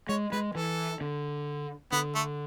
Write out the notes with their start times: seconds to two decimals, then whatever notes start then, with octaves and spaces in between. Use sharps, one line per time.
0.09 G#3 C#5
0.32 G#3 B4
0.55 E3 A4
1.01 D3
1.92 D3 B3
2.15 A3